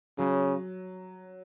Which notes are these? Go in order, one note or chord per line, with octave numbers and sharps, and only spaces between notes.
C#3 F#3